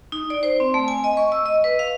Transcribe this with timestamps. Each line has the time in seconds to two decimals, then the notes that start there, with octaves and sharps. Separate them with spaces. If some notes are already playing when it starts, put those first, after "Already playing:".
0.12 D#4
0.30 D5
0.43 C5
0.60 C4
0.74 A3
0.88 G#5
1.04 D#5
1.17 C#6
1.32 E6
1.46 D#5
1.64 B4
1.79 F5